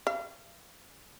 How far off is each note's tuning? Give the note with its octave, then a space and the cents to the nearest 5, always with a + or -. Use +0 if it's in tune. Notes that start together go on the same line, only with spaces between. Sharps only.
F5 -40